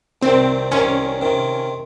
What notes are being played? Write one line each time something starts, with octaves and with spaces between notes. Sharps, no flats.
C2 C3 D#3 C4
C2 C3 D#3 C#4
C3 D#3